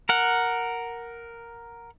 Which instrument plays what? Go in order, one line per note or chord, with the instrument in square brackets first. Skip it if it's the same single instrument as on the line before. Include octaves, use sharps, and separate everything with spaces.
[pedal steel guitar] A#4 F#5